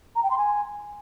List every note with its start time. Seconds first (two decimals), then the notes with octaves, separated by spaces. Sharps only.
0.16 A#5
0.23 G5
0.31 C6
0.38 G#5